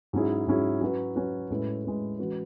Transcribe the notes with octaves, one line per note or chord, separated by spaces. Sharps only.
G#2 F#3 C#4 E4 G#4
G#2 F#3 C#4 E4 G#4
F#3 C#4 F#4 B4
F#3 C#4 F#4 B4
A2 G#3 C#4 E4 B4
A2 G#3 C#4 E4 B4
E3 G#3 C#4 F#4 B4